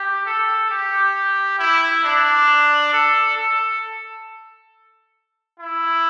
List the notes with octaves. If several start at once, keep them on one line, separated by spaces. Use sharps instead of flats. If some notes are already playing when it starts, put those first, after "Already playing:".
Already playing: G4
A4
G4
E4
D4
A4
A4
E4